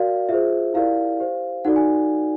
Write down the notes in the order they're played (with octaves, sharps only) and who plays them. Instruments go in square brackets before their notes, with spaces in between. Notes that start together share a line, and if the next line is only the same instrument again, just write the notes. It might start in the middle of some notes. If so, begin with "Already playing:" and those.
Already playing: [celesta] F#4 A#4 D5 F5
F4 G#4 C5 E5
E4 G4 A#4 D5 F5
G4 C5
D#4 F#4 A4 D5 F#5
G#5